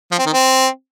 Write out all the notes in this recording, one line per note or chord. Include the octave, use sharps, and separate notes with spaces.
F3
C4
D#3
C4